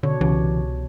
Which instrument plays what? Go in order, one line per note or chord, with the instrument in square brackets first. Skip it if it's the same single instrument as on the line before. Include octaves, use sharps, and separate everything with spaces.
[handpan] B2 D4 C#5 [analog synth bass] D3
[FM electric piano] C2 [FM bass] C#3 [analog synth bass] E3